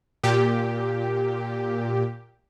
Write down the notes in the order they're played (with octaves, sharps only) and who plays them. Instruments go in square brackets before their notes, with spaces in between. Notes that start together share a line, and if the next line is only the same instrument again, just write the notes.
[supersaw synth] A#2 G4